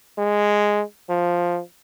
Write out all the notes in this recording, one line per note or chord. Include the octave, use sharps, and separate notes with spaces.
G#3
F3